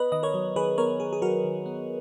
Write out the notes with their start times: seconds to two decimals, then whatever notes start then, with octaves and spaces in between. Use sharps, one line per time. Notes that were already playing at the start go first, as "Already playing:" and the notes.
Already playing: B3 B4 D#5
0.12 D#3 D#5
0.23 A#4 C#5
0.34 F#3
0.56 D#3 G#4 B4
0.78 B3 A#4 C#5
1.00 D#3 G#4
1.13 G#4
1.22 F#3 F#4 A#4
1.44 D#3
1.66 B3